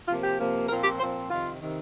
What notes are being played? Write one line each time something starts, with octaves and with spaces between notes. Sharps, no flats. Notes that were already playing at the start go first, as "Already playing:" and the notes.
C3 F3 A#3 F4
G4
C3 F3 A#3
A#2 F3 C4 A#4
G4
A#2 F3 C4 C5
F2 C3 D#3 F4
C3 D#3